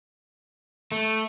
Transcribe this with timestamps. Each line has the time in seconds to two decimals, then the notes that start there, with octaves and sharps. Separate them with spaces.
0.92 A3